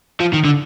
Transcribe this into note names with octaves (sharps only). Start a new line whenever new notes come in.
F3
D#3
D3